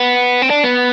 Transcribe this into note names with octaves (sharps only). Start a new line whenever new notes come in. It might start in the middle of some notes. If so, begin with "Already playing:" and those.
Already playing: B3
C4
D4
B3